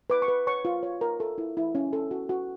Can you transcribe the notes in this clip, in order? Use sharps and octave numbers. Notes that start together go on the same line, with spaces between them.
B4 D6
C#6
B4
C#5 C#6
F4
C#5
A#4
A4
E4
E4
C#4
A4
F#4
F#4